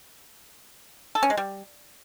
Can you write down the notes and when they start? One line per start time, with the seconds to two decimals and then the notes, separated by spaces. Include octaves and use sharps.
1.15 A4
1.23 C#4
1.30 G#3
1.37 G3